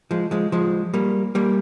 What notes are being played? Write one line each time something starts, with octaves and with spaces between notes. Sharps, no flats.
F3 G#3
F3 G#3
F3 G#3
G3 A#3
G3 A#3